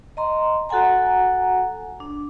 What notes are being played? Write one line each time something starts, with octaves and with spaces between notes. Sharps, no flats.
D#5 A#5 C6
F#4 A4 F#5 G#5 A#5
D4